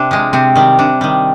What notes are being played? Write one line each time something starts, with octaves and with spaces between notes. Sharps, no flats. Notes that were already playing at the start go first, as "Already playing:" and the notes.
Already playing: C3 D4
F3 G#3
C3 C4
D#3 G3
C3 D4
D#3 G3